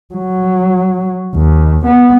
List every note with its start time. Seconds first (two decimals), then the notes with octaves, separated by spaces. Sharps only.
0.14 F#3
1.35 D#2
1.86 B3